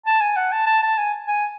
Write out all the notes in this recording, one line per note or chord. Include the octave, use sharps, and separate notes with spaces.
A5
G#5
F#5
A5
A5
A5
G#5
G#5